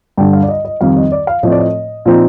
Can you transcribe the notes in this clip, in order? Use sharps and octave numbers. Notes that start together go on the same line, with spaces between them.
G2 D3 G3 G5
F5
D5
D#5
D#5
F2 D#3 G3 C4 F5
D#5
D5
F5
A2 F3 A3 C4 D#5
D5
D#5
A#2 F3 C4 D#4